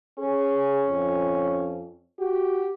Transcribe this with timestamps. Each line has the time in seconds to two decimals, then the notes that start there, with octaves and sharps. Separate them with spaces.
0.19 C#4 G#4
0.87 F2
2.19 F#4 G4